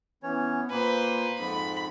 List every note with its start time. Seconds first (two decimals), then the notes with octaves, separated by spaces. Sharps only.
0.23 E3 B3 C#4 C#5
0.70 A#2 A#3 B4 C5
1.38 F2 G#2 B5